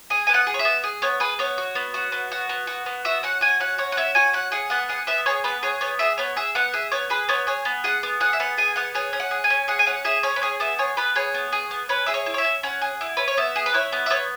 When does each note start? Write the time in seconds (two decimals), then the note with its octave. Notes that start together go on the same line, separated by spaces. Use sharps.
0.10 G#4 G#5
0.27 B3 G#5
0.34 F#5
0.47 G#4
0.54 C#5
0.59 E5
0.65 B3
0.84 G#4
1.02 B3 C#5
1.20 G#4 B4
1.39 B3 C#5
1.58 F#4
1.75 B3
1.94 F#4
2.12 B3
2.32 F#4
2.49 B3
2.67 F#4
2.86 B3
3.05 F#4 E5
3.23 C#4 F#5
3.41 F#4 G#5
3.60 C#4 F#5
3.78 F#4 C#5
3.92 F#5
3.97 C#4 E5
4.15 F#4 G#5
4.33 C#4 F#5
4.52 G#4 F#5
4.70 B3 F#5
4.89 G#4 F#5
5.07 B3 E5
5.26 G#4 C#5
5.44 B3 B4
5.63 G#4 C#5
5.81 B3 C#5
5.99 G#4 E5
6.18 B3 C#5
6.36 G#4 E5
6.55 B3 F#5
6.73 G#4 E5
6.92 B3 C#5
7.10 G#4 B4
7.29 B3 C#5
7.47 G#4 C#5
7.65 B3
7.84 G#4 F#5
8.03 B3
8.20 G#4 F#5
8.33 E5
8.40 B3 F#5
8.57 G#4 G#5
8.76 B3 F#5
8.95 G#4 C#5
9.13 C#4
9.20 F#5
9.31 G#4
9.44 G#5
9.50 C#4
9.68 G#4 F#5
9.79 G#5
9.87 C#4 F#5
10.05 G#4 E5
10.23 C#4 C#5
10.36 B4
10.42 G#4 C#5
10.60 B3 E5
10.79 G#4 C#5
10.97 B3 B4
11.16 G#4 C#5
11.34 B3
11.52 G#4
11.71 B3
11.89 C#4 B4
12.06 G#4 E5
12.14 C#5
12.26 E4
12.34 C#5
12.38 E5
12.44 C#4
12.63 C#4 F#5
12.82 G#4
13.01 E4
13.17 C#4 B4
13.28 C#5
13.37 B3 E5
13.56 G#4
13.66 B4
13.74 E4 C#5
13.92 B3
14.06 E5
14.10 B3 C#5